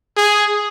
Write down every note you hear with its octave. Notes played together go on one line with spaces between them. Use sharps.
G#4